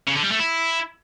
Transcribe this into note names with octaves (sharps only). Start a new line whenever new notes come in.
C#3
D3
G3
A3
E4